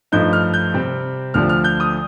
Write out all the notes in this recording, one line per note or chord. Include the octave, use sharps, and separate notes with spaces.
G2 F3 A3 D#4 G6
F6
G6
C3 G3 C4
D2 D3 F3 A3 D4 F6
F6
G6
D#6